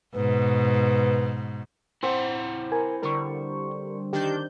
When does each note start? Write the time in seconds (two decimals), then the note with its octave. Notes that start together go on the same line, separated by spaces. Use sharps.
0.15 G#2 B2 B4
2.03 C4 E4 C5 F#5
2.72 A#4 G#5
3.02 D3 G3 A#4 C#6
4.13 D#3 D4 G4 G6